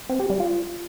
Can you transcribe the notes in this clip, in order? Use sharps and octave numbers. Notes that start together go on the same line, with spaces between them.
C4
G4
G3
F4